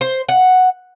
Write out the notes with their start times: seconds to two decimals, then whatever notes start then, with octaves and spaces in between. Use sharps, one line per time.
0.01 C5
0.29 F#5